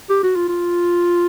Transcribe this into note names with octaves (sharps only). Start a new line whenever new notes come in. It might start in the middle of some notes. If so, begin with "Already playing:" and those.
G4
F#4
F4
F4